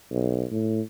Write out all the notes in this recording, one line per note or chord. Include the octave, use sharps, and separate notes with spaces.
B1
A2